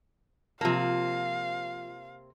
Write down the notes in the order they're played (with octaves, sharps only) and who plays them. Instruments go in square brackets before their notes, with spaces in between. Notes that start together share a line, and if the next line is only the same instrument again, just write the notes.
[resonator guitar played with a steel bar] C3 A#3 [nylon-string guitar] F3 F4 A5 [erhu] F5